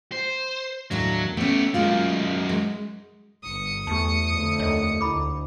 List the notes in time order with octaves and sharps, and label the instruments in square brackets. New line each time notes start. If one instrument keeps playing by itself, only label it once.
[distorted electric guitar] C5
[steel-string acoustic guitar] D#2 A2 D4 [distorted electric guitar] F#3
[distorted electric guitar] A3 G4 [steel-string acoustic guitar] B3 C#4
[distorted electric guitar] F#2 D#3 [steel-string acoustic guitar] G#3 A#3 F4
[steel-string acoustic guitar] G#3
[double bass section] G1 [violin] D#6 C#7
[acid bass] E2 [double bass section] A3 [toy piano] G4 A5
[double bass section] F2 D3 A3
[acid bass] D#2 [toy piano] C#5 D#5
[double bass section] D2 [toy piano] E4 B5 D6